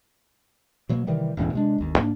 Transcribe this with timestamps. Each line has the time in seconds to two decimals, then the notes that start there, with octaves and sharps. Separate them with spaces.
0.89 B2 F#3 A#3
1.07 C3 D#3 E3 G3
1.37 E1 E2 A2 C#4
1.53 C3 G#3 D4
1.78 G1 D#2
1.98 G#2 A#3 D4